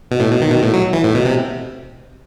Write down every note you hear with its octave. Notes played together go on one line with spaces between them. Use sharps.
B2
A2
B2
D#3
B2
A2
F#3
E3
A2
B2
C3